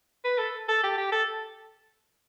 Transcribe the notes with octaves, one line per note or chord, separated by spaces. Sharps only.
B4
A4
A4
G4
G4
A4